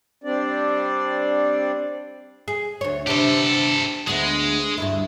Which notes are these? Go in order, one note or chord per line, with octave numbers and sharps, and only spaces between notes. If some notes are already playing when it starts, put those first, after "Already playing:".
G3 C4 D4 D5
G#4
D2 C#5
C3 B3 D4 G4 A4
D2 G#3 B3
D2 G2 E4